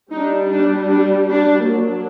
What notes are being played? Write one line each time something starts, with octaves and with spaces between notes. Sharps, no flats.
G3 D4 D#4
D4
D4
D4
F#3 A#3 D4